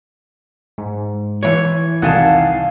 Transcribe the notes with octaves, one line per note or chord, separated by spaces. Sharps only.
G#2
E3 C#5 G#6
C2 F2 D#3 F5 F#5 G#5 A5